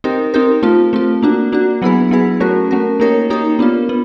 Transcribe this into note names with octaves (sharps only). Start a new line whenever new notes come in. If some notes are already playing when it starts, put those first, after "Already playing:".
C4 D#4 G4 A#4
C4 D#4 G4 A#4
A3 C4 F4
A3 C4 F4
A#3 D4 F#4
A#3 D4 F#4
F#3 B3 E4 G#4 B4
F#3 B3 E4 G#4 B4
A3 C#4 F#4 A#4
A3 C#4 F#4 A#4
A#3 D#4 G4 A#4 C#5
A#3 D#4 G4 A#4 C#5
B3 D4 F4
B3